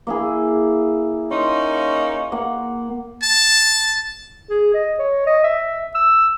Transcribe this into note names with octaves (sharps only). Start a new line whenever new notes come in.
A#3 E4 G#4
A#3 C#4 D#4 C6
A#3 F#5
A5
G#4
D#5
C#5
D#5
E5
E6